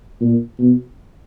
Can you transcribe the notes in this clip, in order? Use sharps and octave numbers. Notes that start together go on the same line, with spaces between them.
A#2
B2